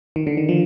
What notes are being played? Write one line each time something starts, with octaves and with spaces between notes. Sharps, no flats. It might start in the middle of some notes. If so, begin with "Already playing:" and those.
D#3
D3
D#3
F3